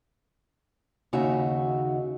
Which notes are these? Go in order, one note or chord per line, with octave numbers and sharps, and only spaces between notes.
D#2 C#3 D#4 F#4 E5